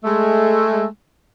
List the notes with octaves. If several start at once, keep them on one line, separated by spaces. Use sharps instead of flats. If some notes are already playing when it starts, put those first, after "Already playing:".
G#3 A3